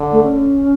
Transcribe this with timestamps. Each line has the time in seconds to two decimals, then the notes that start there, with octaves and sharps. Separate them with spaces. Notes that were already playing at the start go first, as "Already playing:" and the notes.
Already playing: D3
0.12 A3
0.23 C#4